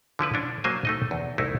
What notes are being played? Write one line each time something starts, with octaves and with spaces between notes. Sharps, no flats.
D3 F3 E4 B4
C#4 D4
F#3 A#3 C5 G#5
A3 D#4 D#5
E2
C2 A3 D#4 E4